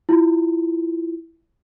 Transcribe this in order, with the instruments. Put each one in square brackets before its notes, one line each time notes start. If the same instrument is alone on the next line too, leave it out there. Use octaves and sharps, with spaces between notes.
[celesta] E4 F4